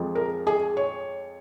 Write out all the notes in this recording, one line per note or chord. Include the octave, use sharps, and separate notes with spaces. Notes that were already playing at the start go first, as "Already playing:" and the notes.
Already playing: F2 F3 G#3
A#4
G#4
C#5